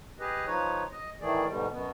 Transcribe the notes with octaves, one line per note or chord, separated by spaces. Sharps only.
G4 G#4 B4 D#5
F3 D#4 B4 C#5
D#5
A2 D#3 E3 A3 G#4 D5
G#2 B2 D3 G3
F#2 B2 B3